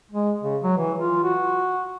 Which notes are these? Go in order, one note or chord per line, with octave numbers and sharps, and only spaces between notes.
G#3
C#3
F#3
E3
F4
F#4